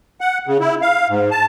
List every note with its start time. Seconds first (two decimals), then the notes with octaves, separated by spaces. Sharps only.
0.21 F#5
0.47 C#3
0.60 E4
0.82 F5
1.09 G#2
1.31 A5